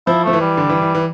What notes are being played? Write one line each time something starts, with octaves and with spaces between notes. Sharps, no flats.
F3 E4
F3 A3
E3
G3
D3
E3
E3
E3